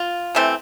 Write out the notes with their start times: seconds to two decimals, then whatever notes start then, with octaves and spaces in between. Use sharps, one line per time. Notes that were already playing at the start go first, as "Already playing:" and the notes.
Already playing: F4
0.35 C3 E3 A3 C4